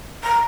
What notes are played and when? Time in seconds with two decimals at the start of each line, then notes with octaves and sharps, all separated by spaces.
0.23 A#5